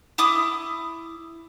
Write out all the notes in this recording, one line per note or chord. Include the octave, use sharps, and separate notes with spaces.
E4 D6 D#6